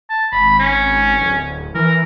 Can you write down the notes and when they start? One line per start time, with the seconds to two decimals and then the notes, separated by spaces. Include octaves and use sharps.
0.10 A5
0.32 G#1 B5
0.59 C#4
1.21 D1
1.75 E3 A#4